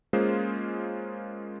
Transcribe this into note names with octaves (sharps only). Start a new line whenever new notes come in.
G#3 A#3 C#4 F4 G#4 C5